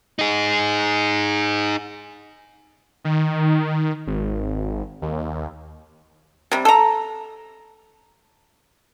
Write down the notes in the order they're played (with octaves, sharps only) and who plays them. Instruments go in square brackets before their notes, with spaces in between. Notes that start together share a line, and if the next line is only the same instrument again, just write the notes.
[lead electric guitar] D#4 G#4
[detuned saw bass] D#3
G#1
D#2
[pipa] C3 G3
A4 A#5